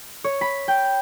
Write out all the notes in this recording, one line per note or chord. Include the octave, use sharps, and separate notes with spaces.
C#5
B5
G5